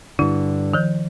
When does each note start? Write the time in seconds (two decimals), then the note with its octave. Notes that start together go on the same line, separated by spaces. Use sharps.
0.19 G2 D3 E4
0.74 D#3 F3 G6